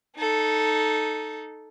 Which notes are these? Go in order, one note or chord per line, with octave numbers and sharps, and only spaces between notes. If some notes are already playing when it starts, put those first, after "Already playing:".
D#4 A4